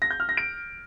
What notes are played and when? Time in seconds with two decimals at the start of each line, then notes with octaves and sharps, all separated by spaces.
0.02 A#6
0.11 G6
0.20 F6
0.29 A#6
0.37 D7